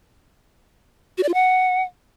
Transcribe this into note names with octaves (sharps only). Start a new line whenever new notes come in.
F#4
D5
F4
F#5